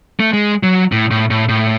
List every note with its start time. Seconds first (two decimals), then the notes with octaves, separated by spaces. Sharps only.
0.20 A3
0.33 G#3
0.63 F#3
0.92 A2
1.11 A2
1.30 A2
1.49 A2